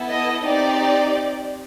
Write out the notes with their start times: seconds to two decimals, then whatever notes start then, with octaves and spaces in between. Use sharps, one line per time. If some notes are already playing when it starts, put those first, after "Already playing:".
Already playing: B3 E4 A4
0.09 D#5
0.44 C4 D#4 G4 D5